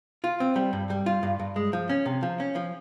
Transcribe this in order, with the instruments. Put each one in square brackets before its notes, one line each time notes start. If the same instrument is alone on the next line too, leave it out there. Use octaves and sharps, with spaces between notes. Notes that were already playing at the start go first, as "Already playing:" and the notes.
[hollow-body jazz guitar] F4
C4
G3
G2
G3
F4
G2
G2
G#3
F3
C#4
C3
F3
C#4
F3